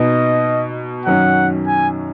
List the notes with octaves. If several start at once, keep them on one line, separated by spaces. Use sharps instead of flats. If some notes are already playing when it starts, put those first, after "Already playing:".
Already playing: B2 B3 D#4 D#5
F#2 D#3 F#3 C#4 F#5
G#5